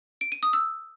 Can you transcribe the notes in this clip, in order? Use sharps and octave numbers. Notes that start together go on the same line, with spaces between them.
D7
D#7
D#6
E6